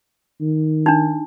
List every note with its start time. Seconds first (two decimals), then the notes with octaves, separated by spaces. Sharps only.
0.41 D#3
0.86 D4 D#4